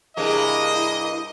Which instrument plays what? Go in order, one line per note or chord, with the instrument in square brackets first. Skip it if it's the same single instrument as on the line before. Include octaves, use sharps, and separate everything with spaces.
[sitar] G2 C3 G#4 [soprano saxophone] A#3 [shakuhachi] E4 [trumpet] D#5